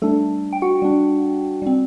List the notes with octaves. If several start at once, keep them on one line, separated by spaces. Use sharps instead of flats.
G3 A3 D4 A4
G5
F#4 F#5
G3 D4
G3 C4